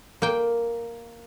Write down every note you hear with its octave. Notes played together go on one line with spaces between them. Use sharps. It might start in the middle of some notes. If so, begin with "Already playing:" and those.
A#3 G5